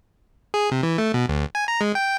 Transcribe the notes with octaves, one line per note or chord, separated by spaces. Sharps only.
G#4
C3
E3
A3
B2
D2
G#5
A#5
G#3
G5